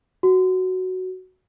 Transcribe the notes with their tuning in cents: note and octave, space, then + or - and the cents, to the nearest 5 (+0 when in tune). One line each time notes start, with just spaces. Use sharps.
F#4 +5